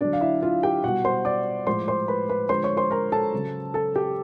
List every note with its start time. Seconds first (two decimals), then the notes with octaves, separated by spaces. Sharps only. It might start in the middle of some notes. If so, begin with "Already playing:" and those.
0.01 D3 F#3 D4 D5
0.13 F5
0.21 E4 E5
0.42 F4 F5
0.63 G4 G5
0.84 B2 G3 F#4 F#5
1.05 C5 C6
1.25 D5 D6
1.67 A2 F3 G#3 C5 C6
1.88 C5 C6
2.08 B4 B5
2.29 B4 B5
2.49 D3 F3 G#3 C5 C6
2.63 C#5 C#6
2.77 C5 C6
2.91 A#4 A#5
3.12 A4 A5
3.32 C#3 F#3
3.74 A4 A5
3.96 G4 G5